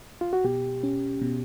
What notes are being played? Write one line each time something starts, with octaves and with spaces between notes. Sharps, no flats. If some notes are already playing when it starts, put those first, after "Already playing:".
F4
F#4
B2 G4
C#4
B2